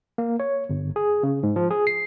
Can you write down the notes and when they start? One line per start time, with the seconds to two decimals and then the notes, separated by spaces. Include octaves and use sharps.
0.18 A#3
0.40 C#5
0.70 G1
0.96 G#4
1.23 C#3
1.43 G#2
1.56 F3
1.70 G#4
1.87 C7